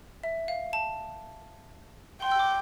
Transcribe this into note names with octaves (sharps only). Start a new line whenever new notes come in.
E5
F5
A5
G5 C6
E6
D6